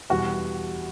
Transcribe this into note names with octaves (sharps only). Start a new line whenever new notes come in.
E2 B2 G3 F#4